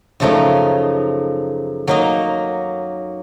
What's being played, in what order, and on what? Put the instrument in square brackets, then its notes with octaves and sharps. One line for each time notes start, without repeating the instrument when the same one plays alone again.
[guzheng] F#2 C#3 F3 A3 D#4
F#3 A#3 D#4 A#4 D#5